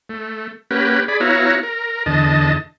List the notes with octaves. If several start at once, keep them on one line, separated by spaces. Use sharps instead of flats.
A3
A#3 C#4 G4 B4 F#5
G#4 D5 B5
B3 E4 F#4 C#5 F5 A#5
A#4
E2 D3 D#5 A5